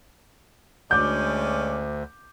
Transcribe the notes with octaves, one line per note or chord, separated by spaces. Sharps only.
D2 G#3 C#4 D5 D6 G6